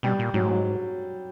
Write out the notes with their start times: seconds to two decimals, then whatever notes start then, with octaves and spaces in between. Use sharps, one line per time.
0.03 B2 G3
0.19 A#2
0.34 G#2 F#3
0.48 F#3